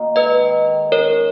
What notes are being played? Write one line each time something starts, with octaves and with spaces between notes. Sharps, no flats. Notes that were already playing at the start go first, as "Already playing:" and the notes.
Already playing: D#3 A#3 D#4 F#4
G#3 B4 D#5
D#3
D#3
C#4 A#4 C#5